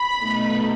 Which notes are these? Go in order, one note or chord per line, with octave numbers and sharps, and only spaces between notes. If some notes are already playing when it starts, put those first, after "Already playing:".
Already playing: B5
B2 A3 D#4